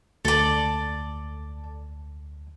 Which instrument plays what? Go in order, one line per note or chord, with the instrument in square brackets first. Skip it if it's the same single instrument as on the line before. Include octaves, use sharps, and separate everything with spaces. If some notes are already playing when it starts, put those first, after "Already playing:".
[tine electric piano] D2 [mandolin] A4 D5